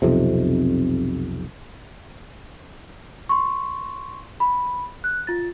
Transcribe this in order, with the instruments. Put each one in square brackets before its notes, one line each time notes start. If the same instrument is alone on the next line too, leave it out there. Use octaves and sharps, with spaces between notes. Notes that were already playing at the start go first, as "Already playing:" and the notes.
[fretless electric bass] B1 F2 C3
[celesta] C6 C#6
B5
F#6
F4 A6